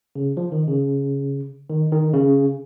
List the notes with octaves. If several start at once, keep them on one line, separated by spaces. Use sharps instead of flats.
C#3
F3
D#3
C#3
D#3
D#3
C#3